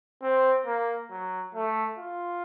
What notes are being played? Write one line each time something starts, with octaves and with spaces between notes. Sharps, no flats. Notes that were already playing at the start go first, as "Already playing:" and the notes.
C4
A#3
F#3
A3
F4